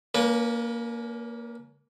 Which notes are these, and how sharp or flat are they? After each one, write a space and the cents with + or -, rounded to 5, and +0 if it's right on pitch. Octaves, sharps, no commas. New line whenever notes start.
A#3 +0 C#4 +40 B4 -35